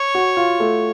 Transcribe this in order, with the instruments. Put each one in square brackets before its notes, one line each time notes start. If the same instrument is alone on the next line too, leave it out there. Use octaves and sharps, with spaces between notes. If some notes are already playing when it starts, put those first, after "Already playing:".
Already playing: [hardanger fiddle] C#5
[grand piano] F#4
F4
A3